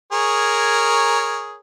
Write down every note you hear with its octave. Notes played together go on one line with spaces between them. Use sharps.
G#4 A#4 C#5